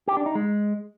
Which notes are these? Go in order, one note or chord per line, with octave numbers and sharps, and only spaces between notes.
G4
D4
D#4
G#3